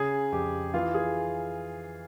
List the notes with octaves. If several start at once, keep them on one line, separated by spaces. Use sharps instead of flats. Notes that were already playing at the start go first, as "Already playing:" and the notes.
Already playing: C#3 G#4
F2 G4
E3 F4
G#4